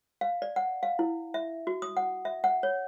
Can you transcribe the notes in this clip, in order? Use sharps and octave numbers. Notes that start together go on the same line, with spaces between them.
F5
D5
F#5
F5
E4
E5
F#4
D#6
F#5
E5
F#5
C#5